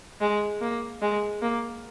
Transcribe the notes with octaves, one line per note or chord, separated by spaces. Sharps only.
G#3
A#3
G#3
A#3